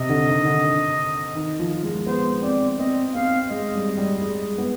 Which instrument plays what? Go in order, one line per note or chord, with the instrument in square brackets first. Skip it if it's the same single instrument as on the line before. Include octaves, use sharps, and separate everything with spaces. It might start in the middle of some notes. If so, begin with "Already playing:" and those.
Already playing: [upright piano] C3 [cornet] D#5
[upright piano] D3
D#3
D3
D#3
F3
G#3
[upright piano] B3 [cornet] C5
[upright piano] C4 [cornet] D5
[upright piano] C4 [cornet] D#5
[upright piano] C4 [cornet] F5
[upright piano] G#3 [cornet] D#5
[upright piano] G3
G3
G#3
B3